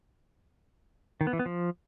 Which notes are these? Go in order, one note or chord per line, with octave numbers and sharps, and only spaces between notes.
D#3
B3
E3
B3
F3